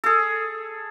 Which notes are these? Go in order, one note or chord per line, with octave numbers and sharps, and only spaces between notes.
G#4 A4